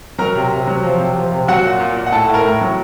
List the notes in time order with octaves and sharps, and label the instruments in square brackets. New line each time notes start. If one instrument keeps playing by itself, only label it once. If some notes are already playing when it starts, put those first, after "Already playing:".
[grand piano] F#3 A#4 A#5
C3
C3
F#3
F3
C3
F3
C3
F#3 F#4 F#5
A#2
A#2
A#2
F#5
A2 A4 A5
A2
A#4 A#5
A2
F#3